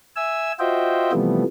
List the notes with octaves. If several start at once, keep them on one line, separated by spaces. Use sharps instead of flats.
E5 G#5 E6
F4 F#4 C5 D#5 E5 G5
C3 E3 F3 G3 A3 B3